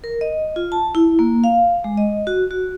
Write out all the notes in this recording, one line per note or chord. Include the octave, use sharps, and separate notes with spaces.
A#4
D#5
F4
A5
E4
A#3
F5
G#3
D#5
F#4
F#4